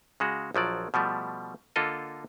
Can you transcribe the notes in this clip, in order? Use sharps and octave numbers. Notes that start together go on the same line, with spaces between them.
C#3 G#3 F#4
A#1 F3 F#3 D5
B2 F3 G3 A3
D3 A#3 F4 A4 D#5